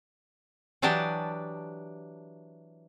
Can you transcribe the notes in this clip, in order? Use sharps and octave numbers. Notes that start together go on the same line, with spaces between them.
E3 F#3 D4 G4 D#5 A5